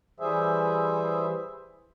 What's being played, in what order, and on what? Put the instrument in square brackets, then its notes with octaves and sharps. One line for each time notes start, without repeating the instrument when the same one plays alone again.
[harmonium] E3 G3 G#4 C5 E5